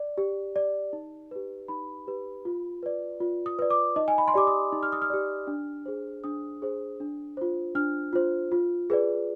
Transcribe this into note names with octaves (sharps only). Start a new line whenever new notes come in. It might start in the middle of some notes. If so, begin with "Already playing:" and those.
Already playing: D5
G4
D5
D#4
G4 B4
D#4 B5
G4 B4
F4
B4 D5
F4
D#6
B4 D5
D6
D#4 D#5
G#5
B5
C6
G4 D5 D6
D#6
D#4
F6
D#6
F6
G4 D5
D4
G#4 C5
D4 D#6
G#4 C5
D4
F4 C5
D4 F6
F4 C5
F4
G#4 B4 D5